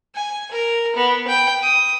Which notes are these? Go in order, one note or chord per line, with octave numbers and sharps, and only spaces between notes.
G#5
A#4
B3
G5
D#6